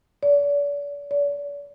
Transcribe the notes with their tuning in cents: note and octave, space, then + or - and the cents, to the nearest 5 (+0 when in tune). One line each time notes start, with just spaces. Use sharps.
D5 -40
D5 -45